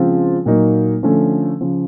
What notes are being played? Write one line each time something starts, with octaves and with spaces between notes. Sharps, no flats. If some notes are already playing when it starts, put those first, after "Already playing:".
Already playing: C#3 F3 G#3 C4 F4
A#2 F#3 A#3 D#4
D3 F3 A3 C#4
C#3 F3